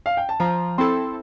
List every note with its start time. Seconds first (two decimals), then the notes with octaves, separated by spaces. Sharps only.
0.06 F5
0.17 G5
0.29 A5
0.40 F3 A#5
0.78 C4 E4 A4 C6